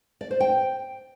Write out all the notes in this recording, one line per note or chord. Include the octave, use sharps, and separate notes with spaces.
D5
C5
G5